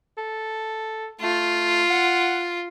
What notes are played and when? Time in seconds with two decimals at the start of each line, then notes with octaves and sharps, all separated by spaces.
0.18 A4
1.21 A3 F4
1.90 F#5